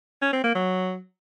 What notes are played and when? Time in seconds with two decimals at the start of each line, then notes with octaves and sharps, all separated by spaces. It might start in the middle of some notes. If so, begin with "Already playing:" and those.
0.22 C#4
0.33 C4
0.44 A#3
0.55 F#3